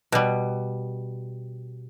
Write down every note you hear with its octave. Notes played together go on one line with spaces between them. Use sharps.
B2 G3